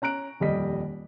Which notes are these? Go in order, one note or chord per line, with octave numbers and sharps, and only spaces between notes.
C#4 A#5 F#6 D7
D#1 F2 G3 D#5 B6